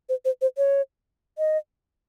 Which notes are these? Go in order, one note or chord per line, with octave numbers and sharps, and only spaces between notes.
C5
C5
C5
C#5
D#5